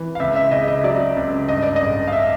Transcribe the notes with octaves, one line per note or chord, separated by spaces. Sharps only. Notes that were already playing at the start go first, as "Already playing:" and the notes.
Already playing: E3
F5
C#2 E5
E5
C#3 D#5
D#5
F#3 D5
C#2
G2 D#5
D5
A1 D#5
F5
E5